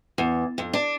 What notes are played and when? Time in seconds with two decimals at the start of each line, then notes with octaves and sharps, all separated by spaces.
0.18 E2
0.58 F2
0.73 D4